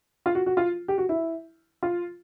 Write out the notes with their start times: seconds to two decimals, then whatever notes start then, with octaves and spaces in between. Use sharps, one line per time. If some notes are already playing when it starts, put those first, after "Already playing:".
0.26 F4
0.35 F#4
0.46 F#4
0.57 F4
0.88 G4
0.98 F#4
1.09 E4
1.83 F4